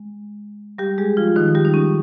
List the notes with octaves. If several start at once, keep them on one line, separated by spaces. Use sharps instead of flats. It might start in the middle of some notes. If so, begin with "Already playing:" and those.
Already playing: G#3
G3 G4
G#3 G#4
F3 F4
D#3 D#4
G3 G4
D#4
C#4